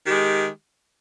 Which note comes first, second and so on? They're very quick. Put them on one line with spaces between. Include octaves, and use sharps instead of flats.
D#3 G4 G#3